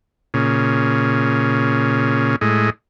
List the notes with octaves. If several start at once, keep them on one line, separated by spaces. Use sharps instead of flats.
A#2 C#3
A2 G#3